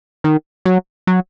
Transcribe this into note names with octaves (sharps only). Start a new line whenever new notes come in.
D#3
F#3
F#3